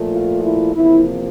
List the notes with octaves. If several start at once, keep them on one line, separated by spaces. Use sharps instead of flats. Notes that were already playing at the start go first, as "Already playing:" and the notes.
Already playing: A#2 F3 A3
F4
E4
E2 C3 F3 A#3 E4